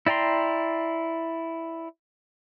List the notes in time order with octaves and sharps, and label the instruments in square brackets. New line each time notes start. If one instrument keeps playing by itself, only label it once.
[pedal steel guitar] E4 D5 G5 A#5 C6